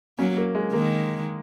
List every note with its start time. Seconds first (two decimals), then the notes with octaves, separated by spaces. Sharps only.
0.19 F#3 A#3 C#4
0.37 A#3
0.55 G#3
0.73 D#3 G#3 A#3